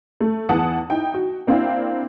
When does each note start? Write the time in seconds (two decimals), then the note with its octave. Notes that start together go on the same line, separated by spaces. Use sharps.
0.20 A3
0.49 E2 E3 F#5 A5 D#6
0.90 D#4 E4 G5
1.14 F#4
1.47 A#3 C4 D4 E4 F5 G5